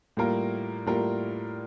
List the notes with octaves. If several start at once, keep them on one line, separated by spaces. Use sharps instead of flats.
A2 G3 A#3 F4 A#4
A2 G3 A#3 F4 A#4